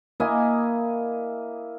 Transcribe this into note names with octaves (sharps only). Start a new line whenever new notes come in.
A#3 E4 D#5 G#5